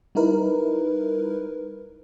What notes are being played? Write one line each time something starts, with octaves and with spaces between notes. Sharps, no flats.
G3 D#4 E4 A#4 B4